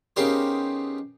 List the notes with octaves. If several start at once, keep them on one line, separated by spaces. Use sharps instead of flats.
C#3 B3 D#4 G4 A#4 C5